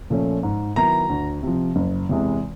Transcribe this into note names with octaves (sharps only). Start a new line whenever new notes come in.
A#2 F3 A3 C#4
G#2
D#3 F#3 B3 E4 A#5
D2
C3 F3
F#1
E2 C3 E3 G#3